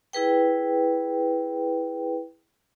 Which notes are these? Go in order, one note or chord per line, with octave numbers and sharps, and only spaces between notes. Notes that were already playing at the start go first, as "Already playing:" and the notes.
E4 G#4 B4 G5